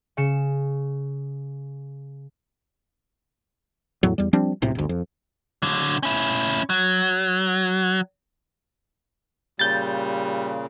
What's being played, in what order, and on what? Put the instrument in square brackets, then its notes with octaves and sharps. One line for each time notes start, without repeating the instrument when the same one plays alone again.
[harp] C#3 C#7 E7
[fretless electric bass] E2 A2 F#3
E2 G3
F3 G3 C4 D4
E1 B1 A2 C3
G1 D2
F2
[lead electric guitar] D3 F#3
C#4 E4
F#3
[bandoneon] A#2 C#3 [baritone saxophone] G3 [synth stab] G6 A6